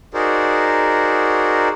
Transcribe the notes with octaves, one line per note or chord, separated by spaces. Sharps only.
D#4 F#4 G#4 A#4 C5 D5